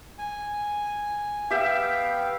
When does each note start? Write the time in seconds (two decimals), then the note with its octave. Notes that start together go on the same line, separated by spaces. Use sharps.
0.18 G#5
1.50 B3 G4 E5 F5 G5